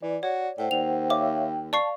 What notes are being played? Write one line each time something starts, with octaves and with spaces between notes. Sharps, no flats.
E3 D5
F#4 C#5
A2 C5 F#5 G5
D#2 F7
C#5 E5 F5 G5 D6
D5 F5 A5 C#6 C7